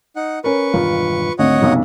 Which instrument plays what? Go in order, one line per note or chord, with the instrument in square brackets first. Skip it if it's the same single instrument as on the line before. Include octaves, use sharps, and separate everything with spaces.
[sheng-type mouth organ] D#4 F#5
[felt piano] C#4 A#4 [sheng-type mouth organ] B4 C#6
[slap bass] E1 G2 D#3 [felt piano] F4
[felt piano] G#1 D2 [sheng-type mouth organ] C#5 D#5 F#5
[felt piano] F#1 B1 [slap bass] C3 F3 G3